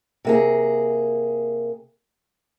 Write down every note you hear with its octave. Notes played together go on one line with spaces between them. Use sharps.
C3 A#3 G#4